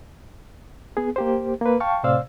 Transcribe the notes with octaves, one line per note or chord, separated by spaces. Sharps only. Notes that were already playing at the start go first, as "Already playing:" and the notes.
B3 G#4
A#3 G4 C5
A#3 B4
F5 G5 A5 C#6
A2 C3 C5 D5 F5 E6